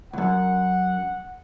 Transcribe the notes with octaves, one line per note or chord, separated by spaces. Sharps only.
C#2 F#2 F#5